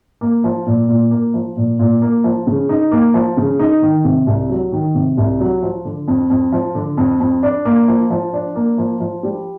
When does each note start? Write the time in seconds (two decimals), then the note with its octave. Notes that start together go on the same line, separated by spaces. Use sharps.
0.21 A#3
0.44 F3
0.66 A#2
0.89 A#2
1.11 A#3
1.34 F3
1.57 A#2
1.79 A#2
2.02 A#3
2.24 F3
2.47 C#3
2.69 D#4
2.92 A#3
3.14 F3
3.37 C#3
3.59 D#4
3.82 D#3
4.04 C3
4.27 C2
4.49 F#3
4.72 D#3
4.95 C3
5.17 C2
5.40 F#3
5.62 F3
5.85 D3
6.08 F2
6.30 F2
6.52 F3
6.75 D3
6.97 F2
7.20 F2
7.43 D4
7.65 A#3
7.88 F3
8.10 F3
8.33 D4
8.56 A#3
8.78 F3
9.00 F3
9.23 G3